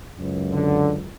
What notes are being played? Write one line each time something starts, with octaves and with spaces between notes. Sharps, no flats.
C#2 F#2
D3